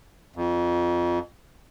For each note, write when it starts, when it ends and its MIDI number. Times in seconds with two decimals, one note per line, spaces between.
0.36 1.19 41